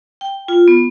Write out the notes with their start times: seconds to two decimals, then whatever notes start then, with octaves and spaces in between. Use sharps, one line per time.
0.21 G5
0.48 F4
0.68 B3